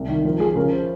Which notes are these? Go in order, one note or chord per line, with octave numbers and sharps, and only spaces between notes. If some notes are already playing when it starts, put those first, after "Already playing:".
Already playing: C2
D#3
F3 A#4
F3 G#4
C#3 A#4
C5